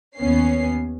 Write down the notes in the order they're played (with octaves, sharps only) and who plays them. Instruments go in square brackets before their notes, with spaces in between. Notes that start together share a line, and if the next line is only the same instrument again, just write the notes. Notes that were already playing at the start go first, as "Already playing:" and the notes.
[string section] D#2 B3 C#4 C7